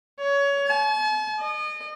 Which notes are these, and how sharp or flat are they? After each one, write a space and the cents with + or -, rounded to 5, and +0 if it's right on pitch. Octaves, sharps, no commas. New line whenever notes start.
C#5 +20
A5 -45
D#5 -35